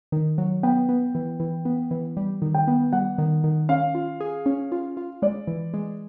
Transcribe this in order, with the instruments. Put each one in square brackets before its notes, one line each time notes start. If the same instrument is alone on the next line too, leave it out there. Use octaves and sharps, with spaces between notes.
[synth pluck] D#3
F#3
[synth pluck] B3 [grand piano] G5
[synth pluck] B3
E3
E3
B3
E3
G3
D#3
[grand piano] G5
[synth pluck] B3
[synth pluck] G3 [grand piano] F#5
[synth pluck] D#3
D#3
[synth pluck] C#4 [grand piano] F5
[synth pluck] F4
G#4
C#4
F4
F4
[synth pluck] G#3 [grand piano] D5
[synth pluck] E3
G#3